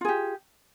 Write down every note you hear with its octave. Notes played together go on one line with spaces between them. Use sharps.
F4 G4 G#4